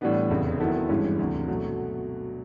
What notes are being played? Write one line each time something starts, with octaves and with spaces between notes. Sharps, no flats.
A2 E3 G3 B3 D4
F1 E2 C#3
D#3 F#3 B3 E4 A4
G#1 G2 E3 G#3 C#4
D2 C3 E3
B2 F#3 A3